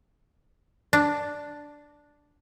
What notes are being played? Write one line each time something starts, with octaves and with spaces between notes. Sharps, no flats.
D4